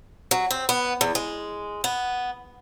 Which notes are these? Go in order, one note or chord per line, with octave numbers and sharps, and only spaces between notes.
F#3
C4
B3
E2
G#3
B3